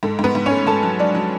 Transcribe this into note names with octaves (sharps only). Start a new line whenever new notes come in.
G#2 A4
G#2
B3 B4
G#2
C#4 C#5
A3
G#2 A4 A5
F#3
F#3 D4 D5
F#3